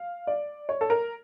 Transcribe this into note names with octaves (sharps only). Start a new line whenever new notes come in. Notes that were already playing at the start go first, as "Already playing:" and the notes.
Already playing: F5
D5
C#5
A4
A#4